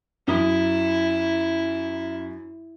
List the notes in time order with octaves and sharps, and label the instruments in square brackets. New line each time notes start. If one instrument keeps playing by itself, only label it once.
[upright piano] F#2 D#6 [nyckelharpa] E4